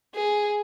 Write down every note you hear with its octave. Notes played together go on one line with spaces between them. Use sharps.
G#4